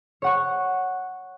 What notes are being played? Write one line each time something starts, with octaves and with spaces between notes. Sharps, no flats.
C#5 F#5 C#6